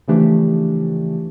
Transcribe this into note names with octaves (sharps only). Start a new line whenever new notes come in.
C#3 E3 F3 A3 D4 G4